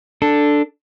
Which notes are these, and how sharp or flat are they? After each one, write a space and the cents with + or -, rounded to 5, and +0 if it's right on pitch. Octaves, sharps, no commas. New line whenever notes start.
D4 +0 A4 +0